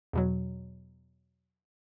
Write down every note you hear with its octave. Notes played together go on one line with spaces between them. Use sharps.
E2 B2 F#3